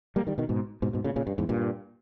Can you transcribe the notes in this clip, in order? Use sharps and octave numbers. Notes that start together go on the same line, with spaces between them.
G3 A#3
D#3 G3
B2 D#3
G#2 B2
G#2 B2
G#2 B2
A#2 C#3
A#2 C#3
G2
E2 G#2
G2 A#2